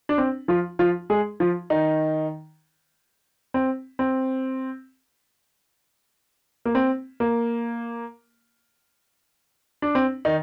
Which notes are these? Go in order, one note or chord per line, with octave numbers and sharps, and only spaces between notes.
D4
C4
F3 F4
F3 F4
G#3 G#4
F3 F4
D#3 D#4
C4
C4
A#3
C4
A#3
D4
C4
D#3 D#4